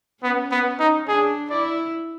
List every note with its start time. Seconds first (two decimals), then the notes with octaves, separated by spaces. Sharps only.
0.23 B3 C#4
0.51 B3
0.79 D#4
1.07 D4 G#4
1.50 E4 D5